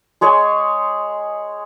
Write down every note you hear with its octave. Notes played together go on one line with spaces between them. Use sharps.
G#3 G#4 C#5